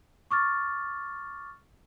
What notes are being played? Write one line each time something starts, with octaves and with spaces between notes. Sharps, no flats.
C#6 D6 F6 A6